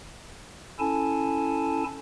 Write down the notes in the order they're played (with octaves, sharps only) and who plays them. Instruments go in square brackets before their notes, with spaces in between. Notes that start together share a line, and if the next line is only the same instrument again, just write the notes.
[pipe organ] C#4 E4 A4 G#5 A5